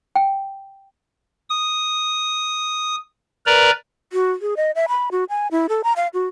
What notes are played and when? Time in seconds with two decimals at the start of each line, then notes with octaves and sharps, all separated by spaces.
0.15 G5
1.50 D#6
3.46 A#4 B4 D5 A#5
4.13 F#4
4.42 G#4
4.57 D#5
4.75 E5
4.88 B5
5.11 F#4
5.29 G#5
5.51 E4
5.69 A4
5.84 A#5
5.96 F5
6.14 F#4